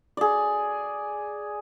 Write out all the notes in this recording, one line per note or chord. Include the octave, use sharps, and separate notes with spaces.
G#4 D5